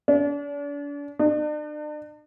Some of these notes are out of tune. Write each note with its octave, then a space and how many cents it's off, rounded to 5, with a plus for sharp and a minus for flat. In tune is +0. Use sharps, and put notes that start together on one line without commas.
D4 -40
D4 +40